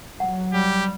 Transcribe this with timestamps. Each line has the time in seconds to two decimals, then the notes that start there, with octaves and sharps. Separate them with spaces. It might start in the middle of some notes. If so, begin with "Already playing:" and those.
0.20 F#3 F#5
0.53 G3 G4